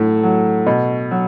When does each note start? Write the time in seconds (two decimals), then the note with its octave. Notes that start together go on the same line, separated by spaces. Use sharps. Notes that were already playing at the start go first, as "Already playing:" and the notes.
Already playing: A2 F#3 A3
0.23 F#3
0.66 B2
1.11 F#3